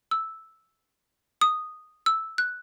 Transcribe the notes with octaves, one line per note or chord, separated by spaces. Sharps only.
E6
D#6
E6
F#6